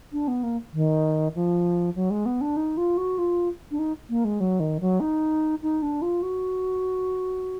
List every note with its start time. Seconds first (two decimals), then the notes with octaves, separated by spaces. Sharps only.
0.12 D4
0.28 B3
0.43 A#3
0.73 D#3
1.35 F3
1.96 F#3
2.11 G#3
2.26 B3
2.41 D4
2.57 D#4
2.77 F4
2.97 F#4
3.18 F4
3.71 D4
3.79 D#4
4.10 A#3
4.25 G#3
4.40 F#3
4.60 D#3
4.81 F#3
5.00 D#4
5.62 D#4
5.82 D4
6.02 F4
6.22 F#4